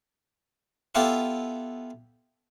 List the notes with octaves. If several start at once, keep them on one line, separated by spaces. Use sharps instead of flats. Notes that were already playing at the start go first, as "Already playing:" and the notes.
B3 E4 F4 G4 A4 B4